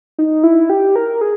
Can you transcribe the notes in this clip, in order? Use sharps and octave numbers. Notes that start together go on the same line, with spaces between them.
D#4
E4
G4
A#4
G#4